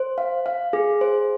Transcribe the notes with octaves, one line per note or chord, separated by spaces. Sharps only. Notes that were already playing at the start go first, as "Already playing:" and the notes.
Already playing: C5
F5
F5
G#4
C5